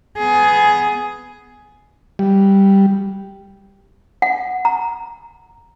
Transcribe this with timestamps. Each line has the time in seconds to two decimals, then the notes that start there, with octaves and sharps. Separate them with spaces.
0.18 B3 G#4
2.19 G3
4.22 F#5
4.65 A#5